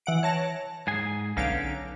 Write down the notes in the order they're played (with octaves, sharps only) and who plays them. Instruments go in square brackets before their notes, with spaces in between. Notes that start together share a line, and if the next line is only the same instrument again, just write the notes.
[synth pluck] E3 F#5 D7
C#5 A5 A#6
[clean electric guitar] G#2 G#4 G#5
[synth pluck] B1 F5 D7 [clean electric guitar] D3 C#4 D#4